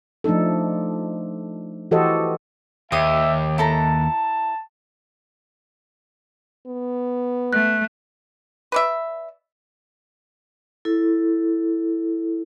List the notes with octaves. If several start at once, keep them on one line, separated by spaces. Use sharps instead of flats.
F3 A3 D4 D#4 A4
E3 F#4 G4 A4 C5 D#5
D#2 G4 E5 D#6
E4 A4 A5 A#5
B3
A3 F#6
B4 D5 E5
E4 A4